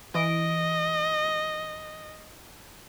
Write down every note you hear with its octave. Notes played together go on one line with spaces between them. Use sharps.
E3 D#5 D7